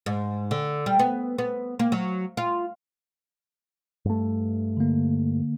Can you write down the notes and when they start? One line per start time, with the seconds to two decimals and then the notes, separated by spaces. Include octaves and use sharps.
0.06 G#2
0.51 D3
0.86 G3
0.99 B3
1.38 B3
1.79 A#3
1.92 F#3
2.37 F4
4.05 G2 A3
4.77 D3 A#3